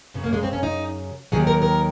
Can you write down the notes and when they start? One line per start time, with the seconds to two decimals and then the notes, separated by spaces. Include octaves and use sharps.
0.14 F#2 C#3 F#3
0.24 A#3
0.33 G#3
0.43 C4
0.53 C#4
0.63 D#4
1.32 D#2 D#3 F#3 G#4
1.47 A#4
1.62 A#4